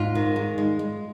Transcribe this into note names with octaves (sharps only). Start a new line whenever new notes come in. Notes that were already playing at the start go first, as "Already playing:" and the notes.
Already playing: G#2 F4
D#3
G#3
G#3
G#3